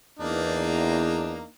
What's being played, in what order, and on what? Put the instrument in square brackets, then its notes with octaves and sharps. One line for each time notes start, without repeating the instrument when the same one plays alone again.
[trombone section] E2 [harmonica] A#3 D4 D#4